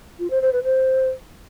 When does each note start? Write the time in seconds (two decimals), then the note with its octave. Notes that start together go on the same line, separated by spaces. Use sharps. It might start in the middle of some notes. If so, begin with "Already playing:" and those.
0.19 F4
0.30 C5
0.42 C5
0.53 B4
0.64 C5